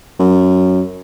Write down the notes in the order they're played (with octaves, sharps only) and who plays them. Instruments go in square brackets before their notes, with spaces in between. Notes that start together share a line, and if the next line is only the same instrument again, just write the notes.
[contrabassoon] F#2